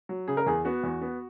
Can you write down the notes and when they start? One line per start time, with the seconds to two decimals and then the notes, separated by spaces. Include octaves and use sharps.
0.09 F#3
0.28 C#3 G#4
0.37 A#4
0.46 E2 G#4
0.65 B3 F#4
0.83 E2
1.01 B3